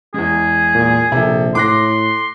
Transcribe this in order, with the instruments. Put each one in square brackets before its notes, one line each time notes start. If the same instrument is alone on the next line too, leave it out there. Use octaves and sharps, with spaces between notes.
[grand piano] E2 G#3 [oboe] G#4
[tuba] A#2
[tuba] A#1 [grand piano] C3 A4
[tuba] A2 [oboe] C6 [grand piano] D6 F#6 A#6